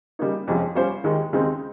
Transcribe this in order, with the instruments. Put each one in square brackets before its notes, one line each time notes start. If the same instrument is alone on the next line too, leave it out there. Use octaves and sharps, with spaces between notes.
[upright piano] C#3 G3 A#3 D#4
F2 C3 F3 G#3 C#4
G3 C#4 F4 C5
D#2 D#3 G#3
D#2 C#3 G#3 C4 D#4